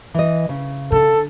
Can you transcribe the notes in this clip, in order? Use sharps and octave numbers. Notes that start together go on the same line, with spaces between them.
E3 D#5
C#3
D3 A4